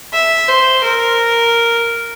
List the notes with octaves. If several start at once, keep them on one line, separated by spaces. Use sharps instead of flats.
E5
C5
A#4